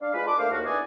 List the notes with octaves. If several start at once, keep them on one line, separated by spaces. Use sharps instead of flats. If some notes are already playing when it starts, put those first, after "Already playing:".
D4 D5 F5
G#3 F4 G#4 B4
D5 A5 C6 D6
A3 A#3 D4 C5 F5
D#2 F#4
B3 D4 E4 G#4 D5 G#5